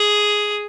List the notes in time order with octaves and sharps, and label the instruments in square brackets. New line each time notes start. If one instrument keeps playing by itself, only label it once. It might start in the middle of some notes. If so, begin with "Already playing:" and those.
Already playing: [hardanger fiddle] G#4